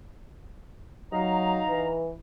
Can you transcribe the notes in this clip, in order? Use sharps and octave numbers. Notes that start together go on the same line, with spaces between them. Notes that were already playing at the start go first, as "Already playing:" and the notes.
F#3 D#4 F5 A#5
E3